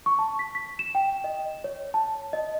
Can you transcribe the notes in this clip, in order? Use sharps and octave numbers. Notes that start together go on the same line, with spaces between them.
C#6
A5
B6
B6
E7
G5
D#5
C#5
A5
D#5